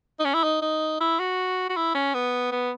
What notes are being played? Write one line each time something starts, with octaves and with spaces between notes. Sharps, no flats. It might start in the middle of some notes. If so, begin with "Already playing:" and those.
D#4
C#4
E4
D#4
D#4
E4
F#4
F#4
E4
C#4
B3
B3